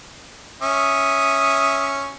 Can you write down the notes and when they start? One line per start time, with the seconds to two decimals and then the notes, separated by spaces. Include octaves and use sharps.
0.62 C#4 E5 D#6